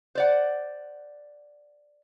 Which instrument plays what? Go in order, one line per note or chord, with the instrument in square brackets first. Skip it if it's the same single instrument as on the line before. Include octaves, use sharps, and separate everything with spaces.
[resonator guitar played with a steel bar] C5 D5 F#5